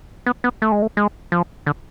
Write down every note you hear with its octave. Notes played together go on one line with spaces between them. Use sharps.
B3
B3
A3
G#3
A3
G#3
F3
D3